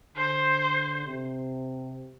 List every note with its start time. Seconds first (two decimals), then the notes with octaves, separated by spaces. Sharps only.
0.16 D3 C5
1.07 C3